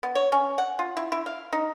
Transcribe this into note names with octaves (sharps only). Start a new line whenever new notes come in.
B3
C#5
C#4
F#5
F4
E4
E4
F5
D#4